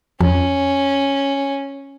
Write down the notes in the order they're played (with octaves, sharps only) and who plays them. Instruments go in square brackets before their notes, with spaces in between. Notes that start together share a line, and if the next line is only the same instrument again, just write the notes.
[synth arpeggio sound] F2 [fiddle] C#4